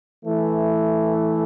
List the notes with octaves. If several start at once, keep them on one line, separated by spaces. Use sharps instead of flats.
E3 A3